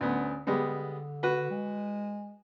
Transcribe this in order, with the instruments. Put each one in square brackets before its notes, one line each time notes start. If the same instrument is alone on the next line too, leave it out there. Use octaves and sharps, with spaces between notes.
[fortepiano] D2 B3 [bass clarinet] C#4
[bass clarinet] D3 [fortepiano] G3 G#3 B3
[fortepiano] F#4 B4
[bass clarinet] G#3